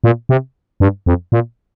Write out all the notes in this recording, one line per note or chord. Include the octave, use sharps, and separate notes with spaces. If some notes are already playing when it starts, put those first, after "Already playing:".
A#2
C3
G2
F2
A#2